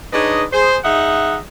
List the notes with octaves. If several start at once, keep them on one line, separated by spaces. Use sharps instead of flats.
D4 D#4 G#4 B4 C#5 D#5
G#4 C5
D#4 G#4 D#5 E5 F#5